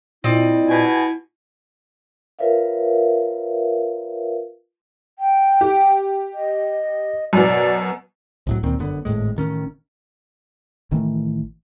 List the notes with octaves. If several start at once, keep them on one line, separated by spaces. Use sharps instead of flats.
A#2 C4 E4 D5 D#5
B2 B3 G#5
F4 A#4 B4 C#5 E5 F5
G5
G4
D#5
F#2 B2 D5
C2 A2 F#3
D2 A#2 D#3 C4
G1 F#2 D3 B3
G#1 C#2 A2 G#3
A1 D#3 C#4
A1 D#3 E3 A3